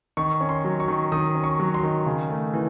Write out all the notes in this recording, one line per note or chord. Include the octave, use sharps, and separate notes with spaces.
D#3 C#6
C#4
C6
F#3
C#6
D#3
D#3 D#6
C#4
C#6
F#3
C6
D#3
C#3
A3
E3